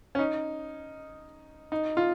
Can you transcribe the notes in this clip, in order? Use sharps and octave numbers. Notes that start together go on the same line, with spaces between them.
C#4
D#4
D#4
F4